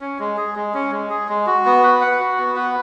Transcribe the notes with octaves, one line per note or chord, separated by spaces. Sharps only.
C#4
G#3
G#4
G#3
C#4
G#3
G#4
G#3
F#4
B3
B4
F#5
F#4
B3
B4